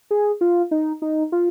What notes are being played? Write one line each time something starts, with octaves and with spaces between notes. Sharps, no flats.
G#4
F4
D#4
D#4
F4